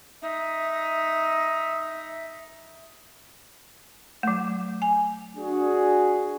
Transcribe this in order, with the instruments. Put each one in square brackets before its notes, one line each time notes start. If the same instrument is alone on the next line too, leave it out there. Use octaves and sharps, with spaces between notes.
[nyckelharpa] D#4 [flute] E5
[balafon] F#3 A3
G#5
[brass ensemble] D4 F#4 G#4